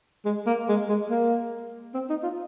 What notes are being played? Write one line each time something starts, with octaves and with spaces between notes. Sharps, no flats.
G#3
A#3
G#3
G#3
A#3
C4
D#4
F4